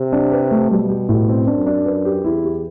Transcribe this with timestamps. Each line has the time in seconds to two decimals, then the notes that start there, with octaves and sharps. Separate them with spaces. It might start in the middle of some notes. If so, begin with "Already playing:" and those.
Already playing: C3
0.12 D4
0.32 B4
0.51 A3
0.70 B2 G3
0.89 G4
1.09 A2
1.28 C4
1.47 F#2 D4
1.66 D4
1.86 B4
2.05 G4
2.24 E2 E4
2.44 G4